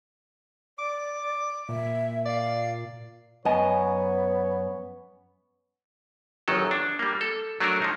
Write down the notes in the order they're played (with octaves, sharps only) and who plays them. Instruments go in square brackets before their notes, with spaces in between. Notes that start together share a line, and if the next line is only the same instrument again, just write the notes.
[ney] D5 [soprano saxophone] D6
[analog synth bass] A#2 [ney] E5
[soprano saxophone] D5 [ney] F5
[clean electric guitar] F#2 G#5 [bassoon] B3 [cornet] C#5 [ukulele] D#5
[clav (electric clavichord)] G1 F#2 D#3 F#3 A4
D4
G3 A#3
A4
F#3 A3 D4 F#4 A#4
F3 D#4